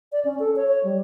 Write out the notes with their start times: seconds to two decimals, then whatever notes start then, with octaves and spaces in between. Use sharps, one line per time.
0.12 D5
0.25 C#4
0.40 A4
0.56 C#5
0.68 C#5
0.84 G3